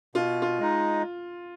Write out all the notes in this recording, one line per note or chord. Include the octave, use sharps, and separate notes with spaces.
B2 F4
F4
G#3 D#4